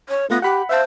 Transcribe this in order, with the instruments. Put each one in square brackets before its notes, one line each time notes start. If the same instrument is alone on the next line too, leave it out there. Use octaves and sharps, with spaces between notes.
[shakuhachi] C#5
[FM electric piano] A3 F4 A#6 [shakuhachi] B3
[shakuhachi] G4 [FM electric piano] F#5 B5
[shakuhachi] C5 [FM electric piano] E5 F5 A5